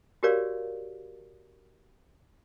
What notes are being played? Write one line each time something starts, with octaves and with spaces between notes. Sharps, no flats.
F#4 G4 A#4 C#5 D5 F5